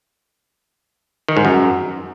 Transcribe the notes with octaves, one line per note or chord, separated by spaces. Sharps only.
D#3
G#2
F#2